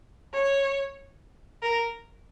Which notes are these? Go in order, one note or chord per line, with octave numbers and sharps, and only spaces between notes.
C#5
A#4